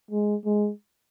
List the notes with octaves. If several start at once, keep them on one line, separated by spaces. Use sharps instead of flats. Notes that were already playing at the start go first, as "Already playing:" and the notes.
G#3
G#3